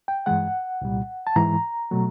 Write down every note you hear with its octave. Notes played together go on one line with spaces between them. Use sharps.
G5
G2 E3 G#3 F#5
C2 A#2 G3
A5
G#2 E3 G#3 A#5
B2 F#3 A3